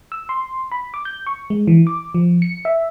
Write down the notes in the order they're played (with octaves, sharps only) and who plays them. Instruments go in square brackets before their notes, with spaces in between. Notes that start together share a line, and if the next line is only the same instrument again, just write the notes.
[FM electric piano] E6
C6
B5
D6
G6
C#6
G#3
E3
D6
F3
C#7
E5